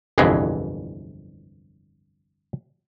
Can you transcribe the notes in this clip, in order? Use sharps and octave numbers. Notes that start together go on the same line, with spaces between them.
G1 C2 F2 E3 G#3